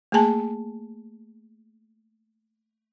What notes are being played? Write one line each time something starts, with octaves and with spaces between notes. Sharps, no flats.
A3 A#3 G#4 G#5 A5